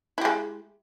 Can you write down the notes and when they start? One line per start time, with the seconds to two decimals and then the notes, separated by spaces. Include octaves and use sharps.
0.18 E4
0.21 G4
0.25 G#3